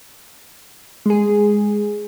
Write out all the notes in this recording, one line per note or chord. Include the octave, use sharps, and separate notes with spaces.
G#3 G#4